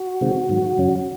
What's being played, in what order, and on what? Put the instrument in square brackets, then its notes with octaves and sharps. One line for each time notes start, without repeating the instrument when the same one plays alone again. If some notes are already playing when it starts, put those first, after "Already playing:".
Already playing: [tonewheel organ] F#4
C3 D#3 G#3 C4
G#2 D#3 F#3
F#2 C#3 F#3 C#4